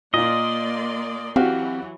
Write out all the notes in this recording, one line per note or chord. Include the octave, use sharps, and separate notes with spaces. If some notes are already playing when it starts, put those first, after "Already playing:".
A#2 A#3 F4 D5 D#5 C6
E3 F#3 C4 F#4 G4 F5